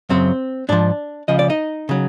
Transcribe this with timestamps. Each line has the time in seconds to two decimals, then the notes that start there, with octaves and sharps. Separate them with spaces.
0.09 F#2 C#3 F#3 C4 C5
0.69 G#2 F3 D4 D5
1.28 C#2 C#3 F3 D#5
1.39 D5
1.50 D#4 D#5
1.89 C#3 F#3